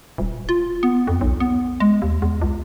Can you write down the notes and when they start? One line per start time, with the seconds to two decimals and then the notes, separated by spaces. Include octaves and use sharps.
0.18 D#1
0.49 F4
0.83 B3
1.07 F2
1.21 B1
1.40 B3
1.80 G#3
2.02 D#2
2.22 E2
2.42 C#2